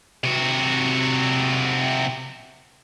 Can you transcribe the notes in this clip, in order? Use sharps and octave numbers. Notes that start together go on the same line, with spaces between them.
C3 F#4